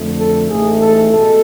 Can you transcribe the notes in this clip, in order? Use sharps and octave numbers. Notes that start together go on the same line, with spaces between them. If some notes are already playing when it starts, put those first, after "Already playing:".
Already playing: F2 D3 A3
A4
A1 G#2 E3 A3 G#4
A4
B2 G#3 A4